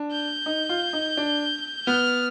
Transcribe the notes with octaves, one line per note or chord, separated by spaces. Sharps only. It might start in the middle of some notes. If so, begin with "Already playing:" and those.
Already playing: D4
G6
D#4
F4
D#4
D4
B3 F6